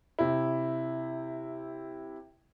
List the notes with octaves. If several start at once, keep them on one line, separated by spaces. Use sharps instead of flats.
C3 E4